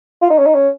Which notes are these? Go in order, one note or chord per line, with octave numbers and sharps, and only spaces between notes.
F4
D#4
C#4
D#4
C#4